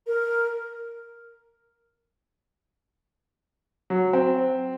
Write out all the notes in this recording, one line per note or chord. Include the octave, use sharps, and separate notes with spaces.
A#4
F#3
C4